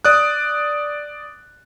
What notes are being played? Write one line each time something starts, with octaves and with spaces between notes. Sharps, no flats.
D5 D#6 F#6